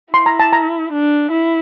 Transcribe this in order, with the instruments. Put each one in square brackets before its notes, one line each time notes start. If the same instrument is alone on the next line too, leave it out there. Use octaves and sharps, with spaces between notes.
[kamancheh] E4 [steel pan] C6
[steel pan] A#5
A5
A#5
[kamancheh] D4
E4